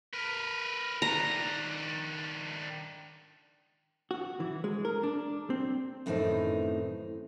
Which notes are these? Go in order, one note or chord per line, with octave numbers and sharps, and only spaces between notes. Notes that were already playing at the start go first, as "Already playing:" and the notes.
A#4 B4
D#3 D4 A#5
F#4
E3
G#3
A#4
D4
C4
F#2 A2 D#3 E3 C4 D#4